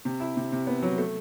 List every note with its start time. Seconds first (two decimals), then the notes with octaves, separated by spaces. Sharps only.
0.05 C3
0.20 E4
0.37 C3
0.52 C3
0.67 B3
0.82 F#3
0.98 A3